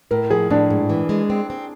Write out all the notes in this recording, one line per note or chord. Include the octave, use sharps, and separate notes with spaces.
A2 A#4
F3 G#4
A2 D4
G#2
E3
G#3
C4
C4